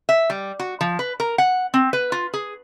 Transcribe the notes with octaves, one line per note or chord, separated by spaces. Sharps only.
E5
G3
F#4
F3
B4
A#4
F#5
C4
B4
F4
G#4